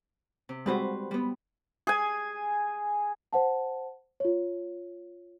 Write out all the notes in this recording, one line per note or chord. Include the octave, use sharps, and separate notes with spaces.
C3
G3 G#3 C4 F#4 B4 C5
G3 B3
G#4 G#5
C5 F#5 A5
F4 C#5